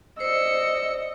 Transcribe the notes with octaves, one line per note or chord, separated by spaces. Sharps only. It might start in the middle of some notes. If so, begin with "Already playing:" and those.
C5 D5 D#5 E6 C#7